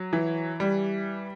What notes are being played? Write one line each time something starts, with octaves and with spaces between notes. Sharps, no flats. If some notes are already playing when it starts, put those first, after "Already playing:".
Already playing: F#3
E3
G3